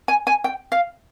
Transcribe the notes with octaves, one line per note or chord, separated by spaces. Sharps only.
G#5
G#5
G5
F5